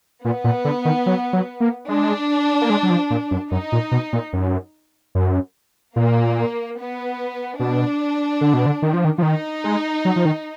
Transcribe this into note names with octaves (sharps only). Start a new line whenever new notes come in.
A#2 B3
A#2
D3
D#3
F#3
F#3
A#3
G#3 D4
A#3
G#3
F#3
F3
A#2
F#2
F#2 D#4
A#2
B2
A#2
F#2
F#2
A#2 A#3
B3
B2 D4
D3
B2
D3
D#3
F3
D#3
F3
D#3 D#4
G#3
F#3
F3
D#3